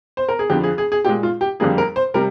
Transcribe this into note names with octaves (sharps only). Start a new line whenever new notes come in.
C5
A#4
G#4
F2 D3 F3 G4
G#4
G#4
G#4
A#2 G#3 G4
F4
G4
F2 D3 G3 A#3 G#4
A#4
C5
C3 G3 A#4